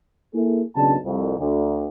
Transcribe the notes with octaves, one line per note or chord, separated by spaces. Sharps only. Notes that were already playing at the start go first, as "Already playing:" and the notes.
A#3 E4 G#4 A4
F#1 B1 C#3 D4 A5
C2 F2
D2